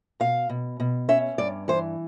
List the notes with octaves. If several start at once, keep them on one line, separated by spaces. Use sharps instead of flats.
B2 F5
B2
B2
C#4 E5
G2 D5
E3 C5